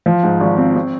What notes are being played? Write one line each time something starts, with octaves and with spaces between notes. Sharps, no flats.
F3
G#2
G#1
C4
C4